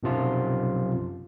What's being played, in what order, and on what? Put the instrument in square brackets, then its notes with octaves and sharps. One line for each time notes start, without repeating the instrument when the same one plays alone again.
[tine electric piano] B1 F#2 C3 F3 F4